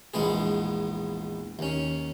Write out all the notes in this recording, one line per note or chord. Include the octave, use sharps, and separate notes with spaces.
A#1 E2 G#3 B3 G#4
D#2 C#4